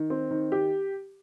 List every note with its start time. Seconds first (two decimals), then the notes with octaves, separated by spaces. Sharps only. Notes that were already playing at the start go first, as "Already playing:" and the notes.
Already playing: D#3
0.10 C4
0.31 D#3
0.52 G4